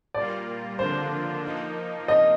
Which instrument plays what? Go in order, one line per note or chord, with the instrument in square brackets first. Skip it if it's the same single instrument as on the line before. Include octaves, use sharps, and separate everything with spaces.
[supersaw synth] A#2 G3 A#3 F4 [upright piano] D5
[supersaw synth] D3 F3 A#3 D4 F4 [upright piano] C5
[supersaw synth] F3 A#3 D#4
[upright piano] D#5